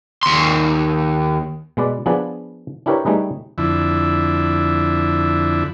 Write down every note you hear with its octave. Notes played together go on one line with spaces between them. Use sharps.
D#2 C6
B2 G#3 B4 D5
F3 B3 D4 G#4 B4 D5
D4 E4 G4 A#4 B4 C#5
G3 A3 D#4 G#4 B4 D#5
F2 D3 E4